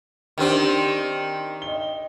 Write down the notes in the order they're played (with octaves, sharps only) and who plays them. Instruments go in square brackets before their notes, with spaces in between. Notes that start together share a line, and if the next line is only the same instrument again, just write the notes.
[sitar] D#3 C4 [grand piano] D4 G4
[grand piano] D#5 G7